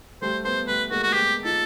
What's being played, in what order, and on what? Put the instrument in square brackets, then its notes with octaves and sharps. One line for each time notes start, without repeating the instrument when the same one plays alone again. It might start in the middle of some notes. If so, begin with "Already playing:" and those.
[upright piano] G3 A3 [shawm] C5
[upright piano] A3 B3 [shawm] C5
[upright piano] G3 A3 [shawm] B4
[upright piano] G#3 A#3 [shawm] F#4
[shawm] F#4
[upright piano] A3 B3 [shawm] G4
[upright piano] D#4 F4 [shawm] A4